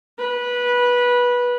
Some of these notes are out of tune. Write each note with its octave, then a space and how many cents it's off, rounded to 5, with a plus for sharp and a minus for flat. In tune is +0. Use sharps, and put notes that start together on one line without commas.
B4 -15